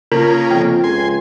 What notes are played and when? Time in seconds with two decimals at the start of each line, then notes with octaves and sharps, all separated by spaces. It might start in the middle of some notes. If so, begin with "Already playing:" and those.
0.12 C#3 A#3 F4 A#4
0.51 F2 G5
0.84 C#2 G#5 C6